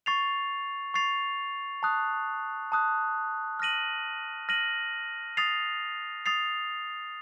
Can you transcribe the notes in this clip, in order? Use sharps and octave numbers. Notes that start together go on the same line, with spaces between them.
C#6 A6 C7 F7
C#6 A6 C7 F7
A5 D#6 F#6
A5 D#6 F#6
F6 A#6 D#7 F#7
F6 A#6 D#7 F#7
D#6 A6 C7 F7
D#6 A6 C7 F7